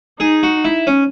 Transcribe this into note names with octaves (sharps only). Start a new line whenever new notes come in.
D#4 G#4
F#4
E4
C#4